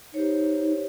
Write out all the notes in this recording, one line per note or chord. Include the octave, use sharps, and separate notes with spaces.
D#4 G4 C5 C#5